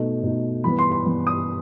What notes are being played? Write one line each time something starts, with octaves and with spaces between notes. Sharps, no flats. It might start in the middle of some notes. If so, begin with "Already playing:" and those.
Already playing: B2 A3 D#4
B2 A3 D#4
E3 G3 B3 B5
C6
C6
E3 G3 B3
D#6